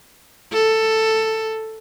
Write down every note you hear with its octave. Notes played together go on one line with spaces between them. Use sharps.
A4